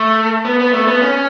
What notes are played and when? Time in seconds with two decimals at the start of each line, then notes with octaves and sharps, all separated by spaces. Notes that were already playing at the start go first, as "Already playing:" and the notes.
Already playing: A3
0.45 B3
0.59 B3
0.73 A3
0.87 B3
1.01 C#4